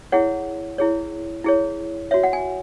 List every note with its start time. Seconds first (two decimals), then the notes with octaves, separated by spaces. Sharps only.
0.12 E4 G#4 C#5 F#5
0.78 E4 G#4 C#5
1.44 E4 G#4 C#5
2.11 F#4 C#5 E5
2.23 F#5
2.33 G#5